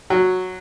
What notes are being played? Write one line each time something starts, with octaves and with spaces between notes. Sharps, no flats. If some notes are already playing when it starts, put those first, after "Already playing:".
F#3